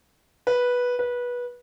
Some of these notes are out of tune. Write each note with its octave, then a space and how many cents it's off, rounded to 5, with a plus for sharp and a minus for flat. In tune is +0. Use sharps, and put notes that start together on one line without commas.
B4 -10
B4 -20